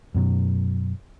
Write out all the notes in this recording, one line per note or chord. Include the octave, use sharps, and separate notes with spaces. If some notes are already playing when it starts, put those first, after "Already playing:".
F#2 B2 F#3